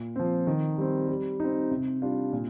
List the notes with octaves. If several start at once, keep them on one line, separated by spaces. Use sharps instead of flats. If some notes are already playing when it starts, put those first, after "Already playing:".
Already playing: A#2
F3 C4
D#3
G3 C4
G3
C4 D#4
C3
G3 D4 F4
A#2